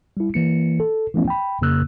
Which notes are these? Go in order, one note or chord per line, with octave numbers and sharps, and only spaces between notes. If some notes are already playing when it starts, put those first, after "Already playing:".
G3 E4
E3 A#3 C#7
A4
E3 F3 A3 B3 C#4 E4
G5 B5
F2 C#3 A#3 E6 F#6